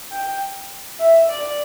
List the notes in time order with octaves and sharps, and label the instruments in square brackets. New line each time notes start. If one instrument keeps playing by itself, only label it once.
[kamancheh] G5
E5
D5